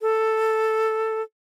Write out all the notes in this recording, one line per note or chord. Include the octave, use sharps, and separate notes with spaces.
A4